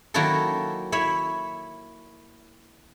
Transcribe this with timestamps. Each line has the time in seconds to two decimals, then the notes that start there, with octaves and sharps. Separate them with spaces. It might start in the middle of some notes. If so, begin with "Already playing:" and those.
0.14 D#3 F#3 A#3 E4 F#4 A4
0.92 E4 C#5 E5